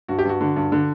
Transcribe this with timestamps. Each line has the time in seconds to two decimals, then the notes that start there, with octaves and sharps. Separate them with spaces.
0.08 G2 F#4
0.19 G4
0.25 G2 F#4
0.41 D3
0.56 G2
0.72 D3